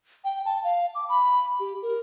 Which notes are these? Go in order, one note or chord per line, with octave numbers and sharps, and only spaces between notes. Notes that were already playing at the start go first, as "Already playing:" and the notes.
G5
A5
F5
D6
B5
G4
A#4